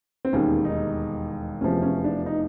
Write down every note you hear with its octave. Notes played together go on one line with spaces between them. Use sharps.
C4
E1 D#2 D#3 G3 C#4
D#4
F1 E2 C3 F3 C#4
C#4
D4
D#4